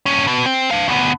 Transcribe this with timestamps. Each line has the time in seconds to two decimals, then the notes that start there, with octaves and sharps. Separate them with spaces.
0.06 G2 C#4
0.27 B2
0.46 C4
0.71 D4 F5
0.88 D2 B3